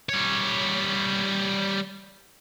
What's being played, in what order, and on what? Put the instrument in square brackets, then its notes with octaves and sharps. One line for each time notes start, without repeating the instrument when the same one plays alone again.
[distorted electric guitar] G3 C#5